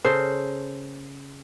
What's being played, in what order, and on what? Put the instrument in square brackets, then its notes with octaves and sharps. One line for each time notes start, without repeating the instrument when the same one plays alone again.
[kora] C#3 A4 A#4 [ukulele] C5